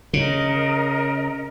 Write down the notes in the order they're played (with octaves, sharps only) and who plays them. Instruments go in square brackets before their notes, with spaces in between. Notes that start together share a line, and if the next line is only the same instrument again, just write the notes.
[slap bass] C#3 [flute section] A#4 D#5